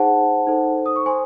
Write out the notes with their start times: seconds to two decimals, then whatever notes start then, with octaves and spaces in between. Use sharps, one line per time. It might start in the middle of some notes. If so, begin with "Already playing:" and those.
Already playing: D#4 G#4 C5 F#5 A5
0.47 D#4 A4 C5
0.86 D#6
0.96 C#6
1.06 C5 G#5 C6